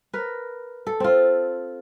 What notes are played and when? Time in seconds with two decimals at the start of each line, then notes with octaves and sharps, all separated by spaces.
0.13 A#4 B4
0.87 A4
1.00 C4 F4